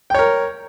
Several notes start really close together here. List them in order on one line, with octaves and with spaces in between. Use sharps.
G5 C#5 A#4